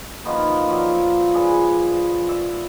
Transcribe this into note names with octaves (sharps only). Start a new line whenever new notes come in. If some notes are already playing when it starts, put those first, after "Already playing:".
D#3 F3 A#3 B3
F3 F#3 D5
D4 G#4 B4
D5 E5